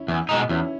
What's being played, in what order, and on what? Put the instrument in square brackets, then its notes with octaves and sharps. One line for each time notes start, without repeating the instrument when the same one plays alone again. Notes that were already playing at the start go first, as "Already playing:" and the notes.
Already playing: [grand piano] C#4 E4
[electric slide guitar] E2
B2 G#3 D#4
[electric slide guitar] E2 [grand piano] C#4 E4